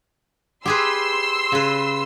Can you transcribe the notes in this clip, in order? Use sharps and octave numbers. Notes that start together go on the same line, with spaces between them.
G4 G#4 B4 C6 E6
C#3 B4